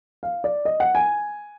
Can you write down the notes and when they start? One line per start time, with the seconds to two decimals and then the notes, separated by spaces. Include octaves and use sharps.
0.23 F5
0.44 D5
0.65 D#5
0.80 F#5
0.95 G#5